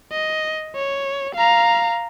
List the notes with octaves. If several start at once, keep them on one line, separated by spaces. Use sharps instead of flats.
D#5
C#5
F5 A#5